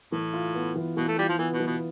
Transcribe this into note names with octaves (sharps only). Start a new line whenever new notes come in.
A2 E3
F4
B3
E3
B2 E3
A3
G3 F4
F3
E3 B3
B2
E3
B2